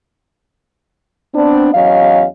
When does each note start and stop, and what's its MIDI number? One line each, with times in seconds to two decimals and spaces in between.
1.35 1.69 59
1.35 1.69 60
1.35 1.69 62
1.73 2.25 40
1.73 2.25 54
1.73 2.25 61
1.73 2.25 75
1.73 2.25 77